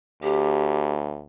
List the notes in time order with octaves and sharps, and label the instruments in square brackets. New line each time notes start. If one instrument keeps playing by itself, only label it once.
[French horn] D2 [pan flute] G4